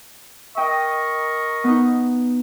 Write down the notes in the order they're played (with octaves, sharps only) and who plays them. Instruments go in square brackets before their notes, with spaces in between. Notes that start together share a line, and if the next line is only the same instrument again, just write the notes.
[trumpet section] A#4 D#5 C#6 [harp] G5
[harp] B3 D#4